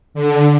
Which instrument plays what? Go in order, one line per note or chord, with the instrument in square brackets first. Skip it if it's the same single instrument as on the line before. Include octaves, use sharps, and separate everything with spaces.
[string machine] D3